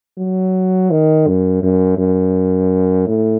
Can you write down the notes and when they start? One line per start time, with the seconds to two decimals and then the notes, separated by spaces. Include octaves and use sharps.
0.18 F#3
0.91 D#3
1.27 F#2
1.63 F#2
1.98 F#2
3.07 A2